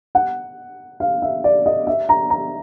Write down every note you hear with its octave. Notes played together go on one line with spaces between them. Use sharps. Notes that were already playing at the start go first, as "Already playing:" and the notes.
F#5
F5
E5
D5
D#5
E5
A#5
A#5